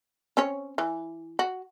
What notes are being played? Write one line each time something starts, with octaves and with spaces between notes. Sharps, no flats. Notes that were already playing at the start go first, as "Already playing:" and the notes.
C4 C#4 C#5
E3
F#4